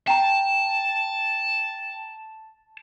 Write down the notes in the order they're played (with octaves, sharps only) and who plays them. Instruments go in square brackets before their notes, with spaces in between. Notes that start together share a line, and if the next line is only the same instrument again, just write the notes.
[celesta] G5 A#5 [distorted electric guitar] A5